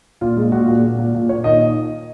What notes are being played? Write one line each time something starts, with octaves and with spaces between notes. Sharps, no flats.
A#2 F4
G#3
A#2 F#4
A#2
A#2
A#2
A#2
A#2 C#5
D#3 D#5